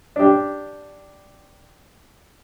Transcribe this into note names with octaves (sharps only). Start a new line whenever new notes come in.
D4 G4